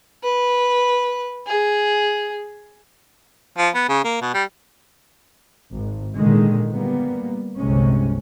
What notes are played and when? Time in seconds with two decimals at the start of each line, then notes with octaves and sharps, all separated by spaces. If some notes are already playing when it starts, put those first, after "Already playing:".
0.23 B4
1.46 G#4
3.58 F3
3.75 B3
3.89 C#3
4.04 A#3
4.21 B2
4.34 G3
5.73 G#1
6.16 A#2 D3 D#3 G#3
6.73 G3 A#3 B3
7.58 G1 C2 C3 G#3 C#4